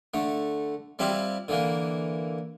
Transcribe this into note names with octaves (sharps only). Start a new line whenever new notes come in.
D3 A3
G3 C4 E4 F4 G4
D3 E3 A#3